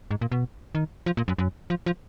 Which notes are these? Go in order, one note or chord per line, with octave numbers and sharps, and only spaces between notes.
G#2
A#2
B2
D#3
F3
A#2
F#2
F#2
F3
F3